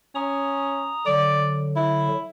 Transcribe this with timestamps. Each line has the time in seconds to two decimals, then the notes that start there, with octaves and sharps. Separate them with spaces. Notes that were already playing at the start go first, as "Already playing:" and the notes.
0.15 C#4 A#5 D#6
1.06 D3 F#3 D5
1.76 E4